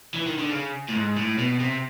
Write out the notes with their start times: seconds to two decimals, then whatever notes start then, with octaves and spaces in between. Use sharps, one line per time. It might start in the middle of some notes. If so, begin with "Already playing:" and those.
0.14 E3
0.26 D#3
0.38 D3
0.50 C#3
0.88 A2
0.94 G#2
1.16 A2
1.38 B2
1.60 C3